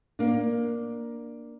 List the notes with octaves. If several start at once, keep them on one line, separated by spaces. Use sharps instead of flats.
A#3 D4